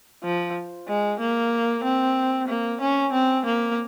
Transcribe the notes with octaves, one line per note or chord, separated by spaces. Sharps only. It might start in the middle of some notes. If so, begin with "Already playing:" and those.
F3
G#3
A#3
C4
A#3
C#4
C4
A#3